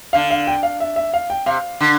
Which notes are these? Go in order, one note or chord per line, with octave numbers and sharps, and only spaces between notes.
D3 F5
F5
G5
F5
E5
E5
F5
G5
C3 F5
D3